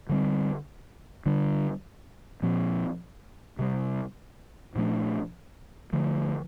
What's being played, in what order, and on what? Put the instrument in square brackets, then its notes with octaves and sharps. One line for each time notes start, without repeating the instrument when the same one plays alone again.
[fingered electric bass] D3 G3 C4
D3 G3 D4
A#2 F3 C4
C3 G3 C4
A#2 F3 A3 D4
D3 F3 A3